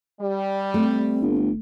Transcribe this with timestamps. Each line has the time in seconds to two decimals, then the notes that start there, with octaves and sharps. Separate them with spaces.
0.20 G3
0.74 A3 C4
1.21 G1